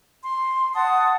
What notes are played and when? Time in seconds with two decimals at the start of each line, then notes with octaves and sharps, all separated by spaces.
0.23 C6
0.74 F#5 A5 D#6